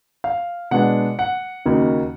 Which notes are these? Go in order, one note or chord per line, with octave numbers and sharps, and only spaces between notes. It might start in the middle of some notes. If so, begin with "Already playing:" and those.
F5
B2 G#3 B3 D4 F#5
F#5
D#2 C#3 F#3 A#3 D#4